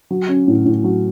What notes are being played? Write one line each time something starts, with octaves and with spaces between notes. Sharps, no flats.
F#3
C#4
A2
A2
F#3